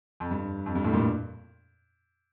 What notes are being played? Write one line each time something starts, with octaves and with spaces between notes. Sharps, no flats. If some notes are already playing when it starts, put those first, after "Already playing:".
F2
G2
F2
G2
F2 A2
G2 A#2